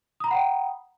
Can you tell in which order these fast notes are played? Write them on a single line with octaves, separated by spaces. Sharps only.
D#6 A#5 B5 F#5 G5